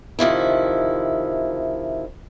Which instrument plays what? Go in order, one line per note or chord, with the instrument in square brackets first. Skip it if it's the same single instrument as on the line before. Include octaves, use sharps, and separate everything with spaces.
[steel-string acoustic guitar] C3 D#3 F3 E4